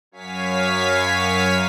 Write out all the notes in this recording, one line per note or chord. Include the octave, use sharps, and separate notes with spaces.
F#2 C#5 F5 G#5 B6